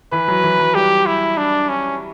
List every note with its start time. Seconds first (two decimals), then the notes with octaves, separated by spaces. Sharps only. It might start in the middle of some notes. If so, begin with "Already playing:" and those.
0.12 E3 B4
0.28 F#3
0.43 E3
0.59 F#3
0.75 G3 G4
1.06 E4
1.37 D4
1.69 C#4